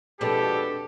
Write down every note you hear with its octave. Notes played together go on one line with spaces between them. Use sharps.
F2 B2 G#3 B3 D4 G4 A4 B4